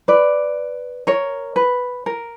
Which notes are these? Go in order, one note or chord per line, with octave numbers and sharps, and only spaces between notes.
B4 D5
A#4 C#5
B4
A#4